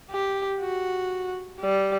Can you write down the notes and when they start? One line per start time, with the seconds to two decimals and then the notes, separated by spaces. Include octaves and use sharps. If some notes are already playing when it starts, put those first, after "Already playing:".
0.11 G4
0.61 F#4
1.60 G3